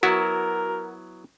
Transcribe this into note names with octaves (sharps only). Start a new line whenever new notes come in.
F#3 B3 E4 F#4 A#4